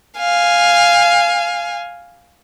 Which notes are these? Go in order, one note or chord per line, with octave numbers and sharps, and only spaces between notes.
F5 G#5